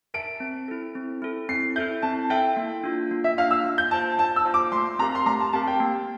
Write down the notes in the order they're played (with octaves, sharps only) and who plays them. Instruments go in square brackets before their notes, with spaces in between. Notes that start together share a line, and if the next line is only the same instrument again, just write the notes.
[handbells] A#4 E5 A5 [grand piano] D7
[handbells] C4
E4 A4
C4
E4 A4
[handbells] C4 [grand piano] C7
[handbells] E4 A4 E5 [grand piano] G6
[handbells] C4 [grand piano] A5
[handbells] E4 A4 E5 [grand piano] G5
[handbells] A#3
D4 F4
A#3
[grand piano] E5
[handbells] D4 F4 [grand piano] F5
[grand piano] E6
[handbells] A#3
[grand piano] G6
[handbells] F4 C5 F5 [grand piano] A5
[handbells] A#3 [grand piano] A5
[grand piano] E6
[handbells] F4 C5 F5
[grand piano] D6
[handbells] A3 [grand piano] C6
[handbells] C4 G4 A#4 F5 [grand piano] A#5
[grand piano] C6
[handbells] A3 [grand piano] A#5
[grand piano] A5
[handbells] C4 G4 A#4 F5 [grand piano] A5
[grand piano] G5
[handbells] A#3